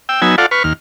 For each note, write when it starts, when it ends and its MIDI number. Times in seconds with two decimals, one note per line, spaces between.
0.09 0.21 79
0.09 0.21 88
0.22 0.36 54
0.22 0.36 59
0.22 0.36 63
0.22 0.36 80
0.22 0.36 88
0.38 0.46 65
0.38 0.46 69
0.38 0.46 74
0.38 0.46 77
0.38 0.46 78
0.51 0.63 71
0.51 0.63 85
0.51 0.63 89
0.64 0.73 39
0.64 0.73 89